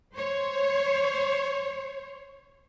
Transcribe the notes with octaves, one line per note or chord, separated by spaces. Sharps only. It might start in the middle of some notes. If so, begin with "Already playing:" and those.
C5 C#5